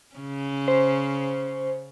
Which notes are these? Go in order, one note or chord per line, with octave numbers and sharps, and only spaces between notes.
C#3 C#4
C5